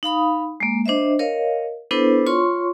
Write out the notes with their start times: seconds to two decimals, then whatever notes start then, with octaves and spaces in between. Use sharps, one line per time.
0.03 D#4 F5 B5 D#6
0.60 G#3 A#3
0.86 D4 C5 D#5 E5
1.19 A#4 C#5 D#5 F5
1.91 B3 D4 E4 A4 B4 C5
2.26 F4 C#5 C6 C#6